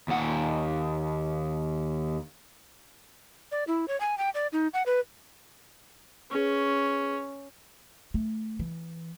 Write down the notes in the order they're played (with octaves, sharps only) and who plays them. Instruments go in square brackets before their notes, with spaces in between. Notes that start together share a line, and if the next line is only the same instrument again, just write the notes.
[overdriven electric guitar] D#2 F#5
[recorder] D5
E4
C#5
G#5
G5
D5
D#4
F#5
B4
[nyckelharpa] C#4 [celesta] G#4 B4 C#6
[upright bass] A3
E3